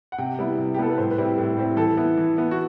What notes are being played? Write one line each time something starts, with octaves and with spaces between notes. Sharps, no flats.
F#5
C3 G5
G3 B3 E4
C3
G4
G3 B3 E4 A4
B4
A2 C5
B4
G3 C4 E4
G4
A2
G3 C4 E4
E3 A4
B3 E4
E3
B3 E4
F#4